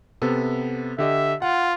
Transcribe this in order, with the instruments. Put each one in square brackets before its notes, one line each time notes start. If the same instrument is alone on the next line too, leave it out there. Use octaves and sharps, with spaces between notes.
[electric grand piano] C3 B3 A4
[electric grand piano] D3 G4 D#5 [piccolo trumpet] E5
[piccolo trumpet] F4 [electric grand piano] F#5